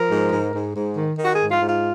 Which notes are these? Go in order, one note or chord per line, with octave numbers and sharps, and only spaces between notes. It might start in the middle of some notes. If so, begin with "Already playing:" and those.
Already playing: F3 A#4
G#2
G#2
G#2
G#2
D#3
D#3
F#4
G#4
G#2
F4
G#2 F4